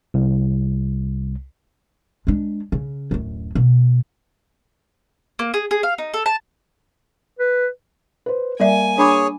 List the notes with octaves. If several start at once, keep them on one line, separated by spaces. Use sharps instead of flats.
C2
G#3 D4
C#3
D1 F#2
B2
A#3
G#4
G#4
F5
D#4
A4
A5
B4
B4 C5
G3 A#3 D5 E5 G#5
D4 G#4 C#5 B5 D6